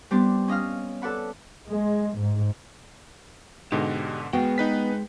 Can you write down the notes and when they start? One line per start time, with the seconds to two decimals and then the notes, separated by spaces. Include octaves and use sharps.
0.11 G3 B3 C4 D4 C5 D5
0.48 C#4 D#5 F5 F6
1.02 A4 B4 D5 F#5 B5
1.67 G#3
2.16 G#2
3.72 G#2 B2 D3 G4 D#5
4.33 G#3 B3 F#4 G#4 G5
4.58 D#4 B4 B6